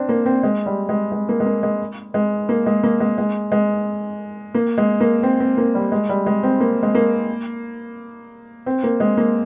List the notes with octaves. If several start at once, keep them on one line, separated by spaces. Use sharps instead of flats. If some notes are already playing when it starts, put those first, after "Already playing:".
Already playing: C4 D4
A#3
C4
G#3
G3
G#3
G#3
A#3
G#3
A#3
G#3
G#3
A#3
G#3
A#3
G#3
G#3
G#3
A#3
G#3
A#3
C4
C4
A#3
G3
G#3
G3
G#3
C4
A#3
G#3
A#3
C4
A#3
G#3
A#3